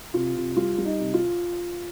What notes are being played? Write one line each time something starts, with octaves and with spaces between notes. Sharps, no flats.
C3 F4
C3
G3 F4
G3
D#4
C3
F4